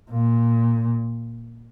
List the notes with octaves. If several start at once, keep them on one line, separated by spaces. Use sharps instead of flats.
A#2